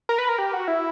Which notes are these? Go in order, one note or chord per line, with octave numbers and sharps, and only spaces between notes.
A#4
B4
A#4
G4
F#4
E4